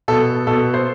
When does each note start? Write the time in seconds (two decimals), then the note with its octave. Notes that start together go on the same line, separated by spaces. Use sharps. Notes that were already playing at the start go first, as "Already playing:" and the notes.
0.08 B2 A4
0.47 B2 A4
0.74 C5